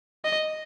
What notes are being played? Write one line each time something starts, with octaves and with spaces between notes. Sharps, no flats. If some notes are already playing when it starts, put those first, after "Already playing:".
D#5